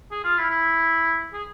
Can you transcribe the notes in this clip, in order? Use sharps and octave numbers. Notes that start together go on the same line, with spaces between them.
G#4
F4
E4
E4
G#4